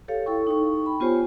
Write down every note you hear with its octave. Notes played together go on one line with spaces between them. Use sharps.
G4 A4 C#5 F5
E4 A4 G5 C#6
D#4 G5 C#6
B5
B3 F4 G4 C5 C#5 G#5